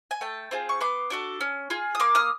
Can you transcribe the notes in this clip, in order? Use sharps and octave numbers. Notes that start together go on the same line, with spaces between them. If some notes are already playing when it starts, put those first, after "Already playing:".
G#5
A3 G5 A5
C4 F4 G#4
C#6
B3 C6 D6
D4 F#4 A4
C#4
F4 G#4
D#6
A#3 C6 D6
D#6 F6